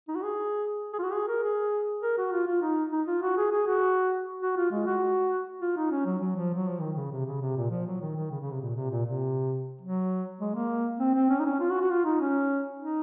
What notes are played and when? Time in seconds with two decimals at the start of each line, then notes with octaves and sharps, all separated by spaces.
0.08 D#4
0.15 F#4
0.23 G#4
0.93 G#4
0.99 F4
1.03 F#4
1.13 G#4
1.28 A#4
1.43 G#4
2.03 A#4
2.18 F#4
2.32 F4
2.47 F4
2.62 D#4
2.92 D#4
3.07 F4
3.22 F#4
3.37 G#4
3.52 G#4
3.67 F#4
4.42 F#4
4.57 F4
4.71 G#3
4.87 F#4
5.61 F4
5.77 D#4
5.91 C#4
6.06 F#3
6.21 F#3
6.36 F3
6.55 F#3
6.68 F3
6.81 D#3
6.96 C#3
7.12 C3
7.26 C#3
7.41 C3
7.57 A#2
7.71 F3
7.86 F#3
8.01 D#3
8.16 D#3
8.31 C#3
8.41 C#3
8.51 C3
8.61 A#2
8.76 C3
8.91 A#2
9.06 C3
9.81 F#3
10.41 G#3
10.55 A#3
11.00 C4
11.15 C4
11.30 C#4
11.40 D#4
11.45 C#4
11.60 F4
11.70 F#4
11.81 F#4
11.90 F4
12.05 D#4
12.20 C#4
12.80 D#4